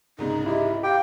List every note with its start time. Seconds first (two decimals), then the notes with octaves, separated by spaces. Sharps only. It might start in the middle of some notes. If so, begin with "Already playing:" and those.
0.19 C2 G#2 C#3 D#4
0.46 E4 G4 D#5
0.83 G4 F5 G5